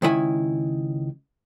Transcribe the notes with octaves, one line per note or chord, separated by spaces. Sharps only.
C#2 D#3 E4 G#5